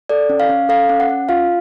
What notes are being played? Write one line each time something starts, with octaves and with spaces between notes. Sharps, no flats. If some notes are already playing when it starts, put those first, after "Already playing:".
A4 D5
C#4
F5
C#4
A4 F5
C#4
F#5
C#4
F4 F5